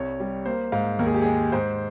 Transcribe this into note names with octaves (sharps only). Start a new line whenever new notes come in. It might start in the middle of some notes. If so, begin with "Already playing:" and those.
Already playing: C2 C#5
G3
A#3 C5
G#2 F5
D#2 A#4
G#4
G4
G#3 G#4
G#2 C5